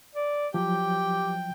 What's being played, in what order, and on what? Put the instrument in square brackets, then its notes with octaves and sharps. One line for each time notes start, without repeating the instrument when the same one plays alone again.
[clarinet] D5
[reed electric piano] F3 F#3 [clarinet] G4 [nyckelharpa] G5